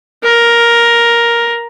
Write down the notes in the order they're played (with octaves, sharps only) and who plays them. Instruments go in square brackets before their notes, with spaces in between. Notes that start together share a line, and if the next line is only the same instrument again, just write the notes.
[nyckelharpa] A#4